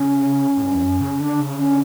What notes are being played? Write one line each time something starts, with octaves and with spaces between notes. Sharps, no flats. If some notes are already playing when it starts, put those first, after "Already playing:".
Already playing: C#3 C#4
A2
G2
E2
F#2
C#3
D3 D4
C#3
D3 C#4